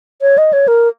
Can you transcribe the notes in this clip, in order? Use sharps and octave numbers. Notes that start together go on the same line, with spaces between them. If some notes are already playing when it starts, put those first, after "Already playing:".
C#5
D#5
C#5
A#4